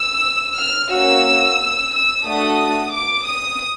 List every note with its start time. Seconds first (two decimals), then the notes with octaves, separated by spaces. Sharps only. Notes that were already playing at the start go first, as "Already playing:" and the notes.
Already playing: E6
0.58 F6
0.91 A#3 C#4 F#4 E6
1.92 E6
2.25 A3 D4 F#4 A4 D#6
2.93 D6
3.27 D#6